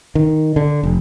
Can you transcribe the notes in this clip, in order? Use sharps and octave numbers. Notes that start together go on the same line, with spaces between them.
D#3
D3
F1